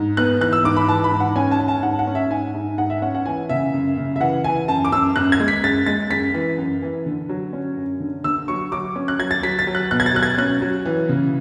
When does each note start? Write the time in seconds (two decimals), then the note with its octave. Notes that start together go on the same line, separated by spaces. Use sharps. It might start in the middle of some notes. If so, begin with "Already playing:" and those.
Already playing: G#2
0.17 B3 F#6
0.41 E3 F#6
0.53 E6
0.64 G#2 D6
0.76 B5
0.88 E3 A5
1.04 B5
1.12 G#2
1.20 F#5
1.36 C#4 G#5
1.51 A5
1.60 C#4
1.68 A5
1.83 G#2 F#5
1.99 F#5
2.07 C#4
2.15 E5
2.30 G#2 G#5
2.54 G#2
2.78 G#2 F#5
2.90 E5
3.02 C#4 F#5
3.15 F#5
3.25 E3 G#5
3.49 C#3 E5
3.74 F#2
3.97 C#3
4.16 E5
4.20 E3 F#5
4.44 E3 G#5
4.68 F#2 A5
4.85 D6
4.92 F#2 E6
5.16 F#2 F#6
5.32 G#6
5.40 G#3
5.48 B6
5.64 F#2 A6
5.86 G#3 A6
6.11 F#2 B6
6.34 E3
6.58 F#2
6.82 E3
7.06 D3
7.29 F#3
7.53 C#4
7.77 F#2
8.00 D3
8.24 D3 E6
8.48 F#3 C#6
8.72 F#3 D6
8.96 C#4
9.08 F#6
9.19 F#3 G#6
9.31 A6
9.43 F#3 B6
9.59 A6
9.67 F#3
9.75 F#6
9.91 B2 F#6
10.00 G#6
10.06 A6
10.14 F#3 F#6
10.23 G#6
10.38 C#4 F#6
10.62 F#3
10.85 E3
11.09 C#3